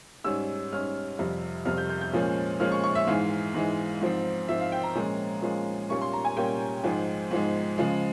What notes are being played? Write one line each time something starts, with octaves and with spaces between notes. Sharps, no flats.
G#2 G3 C#4 E6
G#2 G3 C#4 F6
F2 C3 G3
F2 C3 G3 F6
G6
G6
G6
A#2 F3 G#3 C#4
A#2 F3 G#3 C#4 F6
C#6
C#6
E5
G#2 E3 G#3 F5
G#2 E3 G#3
G#2 F3 C4
G#2 F3 C4 E5
F5
G5
A#5
A#2 F3 G#3 C#4
A#2 F3 G#3 C#4
A#2 G3 A#3 C#4 C#6
C6
A#5
G#5
A#2 G3 A#3 C#4 G5
G#2 F3 G#3
G#2 F3 G#3
C#3 F3 G#3